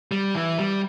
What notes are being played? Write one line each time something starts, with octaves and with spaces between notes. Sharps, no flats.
G3
E3
G3